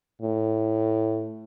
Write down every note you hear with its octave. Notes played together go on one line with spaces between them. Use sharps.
A2